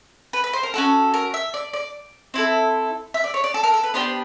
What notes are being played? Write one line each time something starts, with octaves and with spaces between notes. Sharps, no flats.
B4
B4
C5
A#4
C#4 F#4 A4
A#4
E5
D5
D5
C4 E4 A4
E5
D5
C#5
D5
A4
A#4
A4
B4
B3 D4 G4 C5